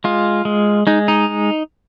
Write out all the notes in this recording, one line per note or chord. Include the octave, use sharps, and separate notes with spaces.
G#3 F4
G#3
G#3 D#4
D#4